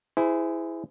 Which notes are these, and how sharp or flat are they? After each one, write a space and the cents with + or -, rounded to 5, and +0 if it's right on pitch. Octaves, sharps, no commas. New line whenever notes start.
E4 +0 G#4 +0 C5 -35